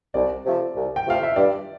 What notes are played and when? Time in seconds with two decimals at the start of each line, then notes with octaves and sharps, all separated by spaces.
0.14 C2 D5
0.45 C3 F3 A3
0.76 C2
0.96 G5
1.06 C3 F3 A3 F5
1.23 E5
1.36 G2 D5